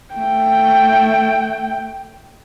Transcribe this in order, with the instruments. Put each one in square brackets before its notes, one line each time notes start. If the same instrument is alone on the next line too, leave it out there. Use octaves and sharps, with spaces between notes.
[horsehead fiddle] A3 G5